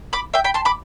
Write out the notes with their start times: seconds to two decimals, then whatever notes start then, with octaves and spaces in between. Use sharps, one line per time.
0.13 B5 D6
0.34 E5 G5
0.44 G5 B5
0.54 A5 C6
0.65 B5 D6